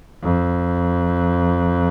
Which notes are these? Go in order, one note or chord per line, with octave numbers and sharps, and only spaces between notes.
F2